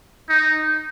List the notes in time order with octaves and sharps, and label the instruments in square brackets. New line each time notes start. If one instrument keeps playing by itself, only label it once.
[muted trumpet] D#4